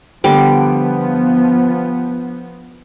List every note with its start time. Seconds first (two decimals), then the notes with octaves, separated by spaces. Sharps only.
0.24 D3 F3 G3 B3 D6